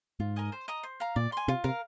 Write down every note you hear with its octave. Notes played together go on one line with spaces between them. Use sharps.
G#2 F4
A#4 D#5 G#5
C5
D#5 A#5 D#6
C5
F5 A#5
A#2 D5
G#5 C6
C3 F4
C3 A#4 F5